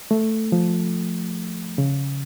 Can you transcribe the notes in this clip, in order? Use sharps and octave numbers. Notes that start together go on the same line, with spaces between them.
A3
F3
C#3